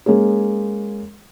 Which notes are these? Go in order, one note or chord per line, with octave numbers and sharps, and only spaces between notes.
G#3 A#3 C#4 G#4